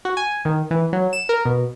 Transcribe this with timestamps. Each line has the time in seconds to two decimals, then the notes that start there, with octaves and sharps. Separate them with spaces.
0.05 F#4
0.17 G#5
0.45 D#3
0.71 E3
0.93 F#3
1.13 E7
1.29 A#4
1.45 B2